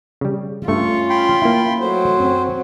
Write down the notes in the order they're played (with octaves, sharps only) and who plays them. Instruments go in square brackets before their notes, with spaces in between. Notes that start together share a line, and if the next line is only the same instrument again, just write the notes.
[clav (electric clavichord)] C#3 G3
[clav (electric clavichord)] G2 A3 [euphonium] C#4 [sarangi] F4 [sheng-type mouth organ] C#6
[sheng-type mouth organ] G5 B5 C6
[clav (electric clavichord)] A#3 E4
[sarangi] F#3 [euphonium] A3 [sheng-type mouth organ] C5
[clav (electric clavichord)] F#2 [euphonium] C4